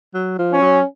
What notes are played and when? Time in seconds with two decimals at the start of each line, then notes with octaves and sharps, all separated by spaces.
0.14 F#3
0.39 F3
0.53 C#4
0.61 F#3